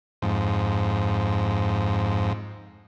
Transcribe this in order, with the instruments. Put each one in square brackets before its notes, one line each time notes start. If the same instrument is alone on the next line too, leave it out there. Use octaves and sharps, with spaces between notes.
[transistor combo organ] F2 G#2